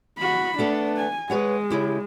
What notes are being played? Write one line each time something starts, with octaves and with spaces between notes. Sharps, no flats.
F#4 B5
A3 B3 D4 A4
G#5
G#3 B4 C#5 F#5
C#3 E4 G4